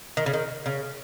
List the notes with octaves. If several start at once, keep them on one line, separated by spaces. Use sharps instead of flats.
D#3
C#3
D#3
C#3